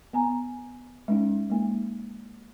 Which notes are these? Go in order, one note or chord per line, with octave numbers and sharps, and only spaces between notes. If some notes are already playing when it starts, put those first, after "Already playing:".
B3 G#5 A#5
G#3 C#4 D#4
G#3 A#3 D#4